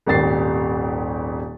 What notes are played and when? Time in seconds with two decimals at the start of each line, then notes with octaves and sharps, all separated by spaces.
0.06 D#1 G#1 G4 A6 C7